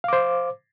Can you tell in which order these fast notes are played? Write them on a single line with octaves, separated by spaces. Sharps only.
F5 D6 C5